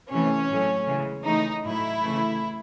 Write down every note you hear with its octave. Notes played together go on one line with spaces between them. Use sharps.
C3 E3 A3 C#4
A2 F#3 A3
C#3 E3 G#3
C#3 E3 A3 D#4
A2 F#3 A3 E4
C#3 E3 A3